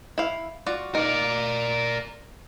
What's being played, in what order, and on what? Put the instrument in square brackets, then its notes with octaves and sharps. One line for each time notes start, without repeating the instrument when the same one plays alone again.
[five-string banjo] E4 F5
F4 F#4 D5
[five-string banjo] D#4 [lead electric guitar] A#4 D5